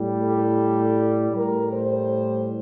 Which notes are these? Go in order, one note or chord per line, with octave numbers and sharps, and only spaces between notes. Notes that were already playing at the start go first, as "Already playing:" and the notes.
Already playing: A2 G3
A4
A2 G3 A#4
C5